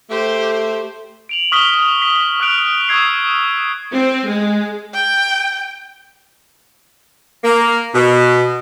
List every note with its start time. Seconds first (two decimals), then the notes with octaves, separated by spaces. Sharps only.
0.10 A3 G4 C5
1.29 D7 F7 F#7
1.52 C#6 D#6 F6 B6 F7 G7
2.02 B6
2.40 D#6 F6 F#6 D7 F7
2.89 C#6 E6 G#6 C7
3.93 C4
4.27 G#3
4.94 G5
7.44 A#3
7.95 B2